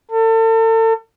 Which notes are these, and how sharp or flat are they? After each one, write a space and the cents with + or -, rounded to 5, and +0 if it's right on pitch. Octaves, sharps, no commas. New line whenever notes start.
A4 +40